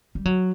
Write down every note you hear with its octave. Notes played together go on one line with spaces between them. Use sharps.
G3
F#3